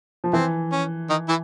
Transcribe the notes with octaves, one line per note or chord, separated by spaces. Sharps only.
F3
E3 C4
C#4
D#3 D#4
E3 E4